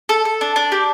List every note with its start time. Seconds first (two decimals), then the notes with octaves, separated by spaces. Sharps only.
0.09 A4
0.25 A4
0.41 D4
0.56 D4
0.72 G4